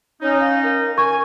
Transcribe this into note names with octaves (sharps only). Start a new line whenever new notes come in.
C#4 D#4 C#5
F5
A#4
A#4 G#5 C#6